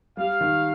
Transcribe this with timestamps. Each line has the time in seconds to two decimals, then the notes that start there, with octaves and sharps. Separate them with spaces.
0.17 G3 F5
0.41 D#3